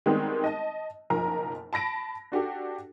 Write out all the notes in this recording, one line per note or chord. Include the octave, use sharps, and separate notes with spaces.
D#3 G3 G#3 B3 C4 D#4
D#5 A5
F#1 B1 F3 A#4 A#5
A5 B5 A#6 D7
D4 F#4 G4 A4